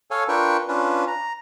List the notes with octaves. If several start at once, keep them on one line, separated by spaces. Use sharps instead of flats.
A4 C#5 F5 G#5
D4 F4 A#4 B4 G5 C#6
C#4 D4 F4 B4
A#5